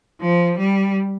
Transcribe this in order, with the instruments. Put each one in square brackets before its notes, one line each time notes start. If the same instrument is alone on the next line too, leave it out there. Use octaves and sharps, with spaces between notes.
[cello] F3
G3